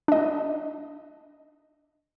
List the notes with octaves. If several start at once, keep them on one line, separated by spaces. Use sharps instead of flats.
D4 D#5